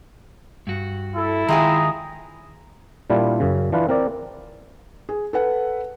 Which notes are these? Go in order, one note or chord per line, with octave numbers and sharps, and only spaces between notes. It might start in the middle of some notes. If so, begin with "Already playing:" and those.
G2 F#4
E4 A4
D#3 G#3 F4 G#4 E5 G5 A#5
A#2 G3 D4 E4 F4
F#2 C#3
E3 D4 F4 B4
C4 A#4 D5
G#4
A4 B4 F#5